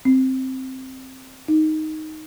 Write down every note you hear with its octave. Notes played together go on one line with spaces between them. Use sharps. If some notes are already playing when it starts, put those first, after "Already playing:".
C4
D#4